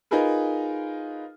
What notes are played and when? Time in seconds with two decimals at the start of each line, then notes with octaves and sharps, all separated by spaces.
0.11 D#4 F4 G#4 A#4 B4